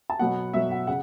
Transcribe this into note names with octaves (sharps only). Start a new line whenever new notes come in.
A5
B2 F#3 B3 F#5
B2 F#3 B3 E5
F#5
C#3 F#5